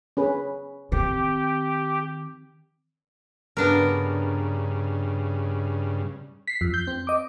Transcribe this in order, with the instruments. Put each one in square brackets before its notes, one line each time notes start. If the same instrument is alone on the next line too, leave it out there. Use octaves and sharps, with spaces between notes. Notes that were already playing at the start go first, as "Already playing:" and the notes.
[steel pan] C#4 G#4 B4
[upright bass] D#3 C4 [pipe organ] G4
[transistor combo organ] G2 C#3 [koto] B3 D4 A#4
[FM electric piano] B6 C7
F2
G6
C4
D#5 D6